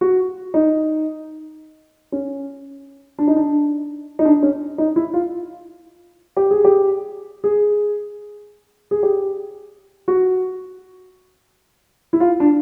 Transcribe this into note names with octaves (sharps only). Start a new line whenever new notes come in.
F#4
D#4
C#4
D4
D#4
D4
D#4
D4
C#4
D#4
E4
F4
G4
G#4
G4
G#4
G#4
G4
F#4
E4
F4
D4